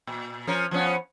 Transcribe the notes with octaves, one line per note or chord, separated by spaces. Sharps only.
A#2
F3 C#4 A#4
F3 B3 C#4